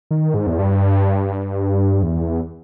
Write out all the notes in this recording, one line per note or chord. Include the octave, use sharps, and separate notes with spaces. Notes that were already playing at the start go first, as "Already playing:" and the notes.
D#3
G#2
E2
G2
E2